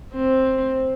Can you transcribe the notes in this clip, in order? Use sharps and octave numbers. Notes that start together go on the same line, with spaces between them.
C4